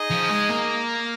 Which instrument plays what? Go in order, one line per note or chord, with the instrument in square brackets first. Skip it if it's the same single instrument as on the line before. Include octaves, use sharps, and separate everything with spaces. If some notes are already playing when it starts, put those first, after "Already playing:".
Already playing: [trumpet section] D#4 G#4 D#5
[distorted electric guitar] F3
G#3
A#3